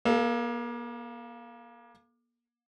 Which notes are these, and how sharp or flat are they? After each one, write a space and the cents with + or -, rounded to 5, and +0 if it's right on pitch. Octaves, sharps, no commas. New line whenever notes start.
A#3 +40 A4 -10 F5 +0